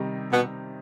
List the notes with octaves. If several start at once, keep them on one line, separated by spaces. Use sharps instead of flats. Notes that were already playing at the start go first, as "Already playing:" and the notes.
Already playing: C3 D#3 G3 D#4
B2 B3